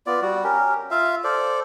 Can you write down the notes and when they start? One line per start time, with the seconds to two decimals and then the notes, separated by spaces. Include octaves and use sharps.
0.06 B3 F4 D5
0.22 G3 F#4
0.44 C#4 G4 A#4
0.91 F4 E5 F5
1.24 A4 C5 D5